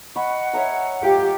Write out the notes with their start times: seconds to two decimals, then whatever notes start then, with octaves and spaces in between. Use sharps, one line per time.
0.16 D#5 F#5 B5 C#6
0.53 C#5 E5 A#5
1.03 F4 G4 F5